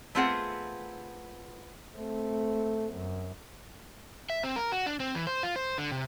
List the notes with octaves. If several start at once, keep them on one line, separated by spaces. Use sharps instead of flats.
A3 B3 C4 F4 G#4 F#5
A3 C4
F#2
E5
C4
A#4
F#4
D4
C4
E3
C5
F4
C5
D3
C3